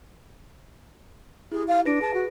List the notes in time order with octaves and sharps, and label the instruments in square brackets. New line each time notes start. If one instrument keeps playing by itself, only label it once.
[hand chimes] E4 G4 [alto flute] G#4
[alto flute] F5
[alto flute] D4 [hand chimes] B4 A#6 D7
[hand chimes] G#4 B4 [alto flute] A5
[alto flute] F#4